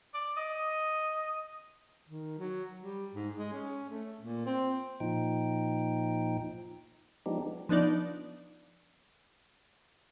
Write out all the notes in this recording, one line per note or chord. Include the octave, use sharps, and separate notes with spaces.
D5
D#5
D#3
F#3
G3
G#2
G#3
C#4
A3
A#2
C4
A#2 F3 D#4 G5
F3 G#3 B3 D4 D#4 G4
F3 B3 D4 D#4 D5